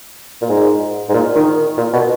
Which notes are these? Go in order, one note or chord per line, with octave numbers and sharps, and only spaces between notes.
A#2
G#2
G#2
A#2
D#3
A#2
B2